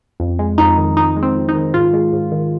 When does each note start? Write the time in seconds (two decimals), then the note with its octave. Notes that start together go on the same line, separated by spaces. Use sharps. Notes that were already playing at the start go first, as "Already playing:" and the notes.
0.20 F2
0.39 G#3
0.58 F2 D#4
0.78 D#3
0.96 F2 D#4
1.16 G#3
1.23 C4
1.36 F2
1.49 D#4
1.55 D#3
1.74 G#2 F4
1.93 G#3
2.13 G#2
2.32 D#3